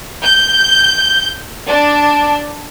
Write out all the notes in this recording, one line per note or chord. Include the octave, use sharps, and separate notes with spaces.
G6
D4